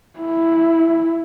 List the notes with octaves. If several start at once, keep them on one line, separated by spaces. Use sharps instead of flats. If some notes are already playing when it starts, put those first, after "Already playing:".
E4